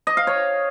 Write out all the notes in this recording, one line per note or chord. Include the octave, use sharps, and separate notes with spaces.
D#5
F5
C#5